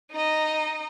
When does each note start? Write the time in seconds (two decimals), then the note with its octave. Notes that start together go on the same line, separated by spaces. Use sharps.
0.12 D#4 D#5